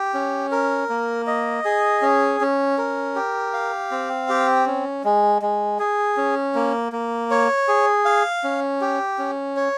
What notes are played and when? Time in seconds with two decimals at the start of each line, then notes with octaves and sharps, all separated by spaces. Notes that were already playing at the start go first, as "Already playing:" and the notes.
Already playing: G4
0.14 C#4
0.52 A#4
0.90 A#3
1.27 D#5
1.65 G#4
2.02 C#4
2.41 C#4
2.78 A#4
3.16 G4
3.53 F5
3.91 C4
4.29 G4
4.66 C#4
5.04 G#3
5.42 G#3
5.79 G#4
6.17 C#4
6.55 A#3
6.92 A#3
7.31 C#5
7.68 G#4
8.05 F5
8.44 C#4
8.81 G4
9.18 C#4
9.57 C#5